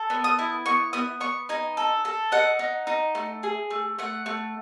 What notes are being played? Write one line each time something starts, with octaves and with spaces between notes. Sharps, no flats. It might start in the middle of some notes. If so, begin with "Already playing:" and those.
Already playing: A4
B3
D#6
E4
B3 C#6
B3 D#6
B3 C#6
D#4 G#5
A4
A4
D#4 F#5
D#4
D#4
A3
G#4
A3
A3 F#5
A3